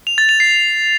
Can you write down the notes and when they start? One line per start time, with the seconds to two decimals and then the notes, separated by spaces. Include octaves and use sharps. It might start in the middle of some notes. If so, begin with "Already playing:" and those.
0.07 F7
0.18 A6
0.29 F7
0.40 C7